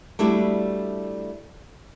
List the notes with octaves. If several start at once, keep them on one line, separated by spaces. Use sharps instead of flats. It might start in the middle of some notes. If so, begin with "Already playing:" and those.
G3 A3 D4 E4 F#4